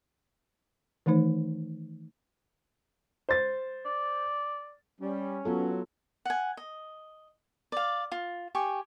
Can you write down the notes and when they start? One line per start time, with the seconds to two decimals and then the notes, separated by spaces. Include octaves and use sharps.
1.06 D#3 E3 A3 D#4 C5
3.29 C5 A6
3.86 D5
5.00 G3 C#4
5.45 F#3 B3 F4 A4
6.25 F#5 G#5
6.57 D#5
7.72 D5 F5
8.12 F4
8.55 G4 G#5 C#6